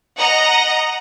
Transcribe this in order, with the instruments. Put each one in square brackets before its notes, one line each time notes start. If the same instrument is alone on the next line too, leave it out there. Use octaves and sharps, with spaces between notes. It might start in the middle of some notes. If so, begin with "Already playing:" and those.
[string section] D#5 F#5 A#5